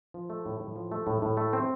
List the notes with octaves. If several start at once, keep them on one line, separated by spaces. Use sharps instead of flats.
F3
A3
A2
A2
F3
A3
A2
A2
A3
C4